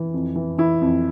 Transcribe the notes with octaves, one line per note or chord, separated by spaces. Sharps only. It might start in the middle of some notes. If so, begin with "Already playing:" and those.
Already playing: E3
F2
E3
E3 E4
F2